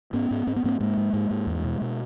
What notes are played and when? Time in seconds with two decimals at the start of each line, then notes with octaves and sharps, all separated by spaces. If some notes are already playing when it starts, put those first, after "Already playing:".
0.13 G#2 B3 C#4
0.31 G#2
0.47 G#2 C4
0.56 B3
0.64 G#2 A#3 C4
0.80 G#2 G#3 A#3
0.97 G#2
1.13 G#2
1.31 G#2
1.47 E2
1.64 B2
1.81 B2